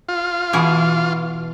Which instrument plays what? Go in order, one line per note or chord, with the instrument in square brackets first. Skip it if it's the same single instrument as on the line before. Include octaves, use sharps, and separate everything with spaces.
[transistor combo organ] F4
[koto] B2 E3 G#4